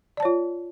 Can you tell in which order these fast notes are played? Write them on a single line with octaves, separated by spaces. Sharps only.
D5 A5 C#5 F4